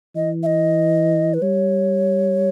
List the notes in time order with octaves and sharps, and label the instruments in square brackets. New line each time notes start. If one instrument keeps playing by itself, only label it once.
[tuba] E3 [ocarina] D#5
[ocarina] E5
D#5
B4
[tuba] G3 [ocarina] C#5